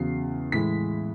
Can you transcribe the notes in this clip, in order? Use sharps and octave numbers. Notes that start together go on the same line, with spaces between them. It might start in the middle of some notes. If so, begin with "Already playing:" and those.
Already playing: E2 C#3 F#3 C7
A2 E3 G#3 B6